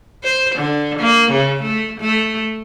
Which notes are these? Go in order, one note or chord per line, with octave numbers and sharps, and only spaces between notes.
C5
D3
A#3
C#3
A3
A3